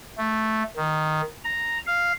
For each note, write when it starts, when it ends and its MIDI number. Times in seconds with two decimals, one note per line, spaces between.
0.18 0.63 57
0.76 1.21 51
1.44 1.78 82
1.87 2.13 77